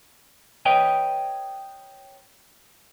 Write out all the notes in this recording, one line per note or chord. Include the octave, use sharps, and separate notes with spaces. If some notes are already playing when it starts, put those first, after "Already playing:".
B4 C#5 D#5 G5